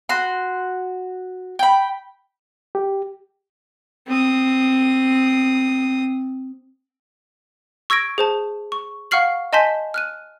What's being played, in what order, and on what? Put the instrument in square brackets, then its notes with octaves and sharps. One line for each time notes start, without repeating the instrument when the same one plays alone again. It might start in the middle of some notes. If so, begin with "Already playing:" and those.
[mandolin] F#4 C6
G5 B5
[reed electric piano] G4
[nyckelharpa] C4 D#6
[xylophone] C#6 E6 G#6 A#6 D7
G#4 C5 A5
C#6
F5 F#5 C#6 F6 C7 F#7
D#5 G#5 A5 C6 G6 B6
F6 F#6 D#7